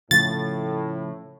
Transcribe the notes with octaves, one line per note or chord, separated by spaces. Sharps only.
A2 C#3 F3 A3 A6